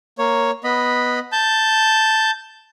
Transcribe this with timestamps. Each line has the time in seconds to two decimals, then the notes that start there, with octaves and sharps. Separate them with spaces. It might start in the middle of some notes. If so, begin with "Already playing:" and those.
0.19 A#3 C#5
0.64 B3 D#5 B5
1.32 A5 G6